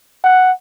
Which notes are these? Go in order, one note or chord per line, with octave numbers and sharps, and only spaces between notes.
F#5